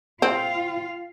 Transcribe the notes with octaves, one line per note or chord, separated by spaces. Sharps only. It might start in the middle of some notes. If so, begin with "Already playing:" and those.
C4 F4 F5 G5